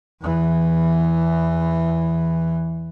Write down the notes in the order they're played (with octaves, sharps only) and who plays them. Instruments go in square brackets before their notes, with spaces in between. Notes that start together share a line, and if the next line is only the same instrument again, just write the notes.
[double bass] E2 E3